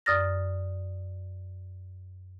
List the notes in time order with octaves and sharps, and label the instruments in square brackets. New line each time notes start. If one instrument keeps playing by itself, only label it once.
[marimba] F#2 D5 D#6 F6 A6 A#6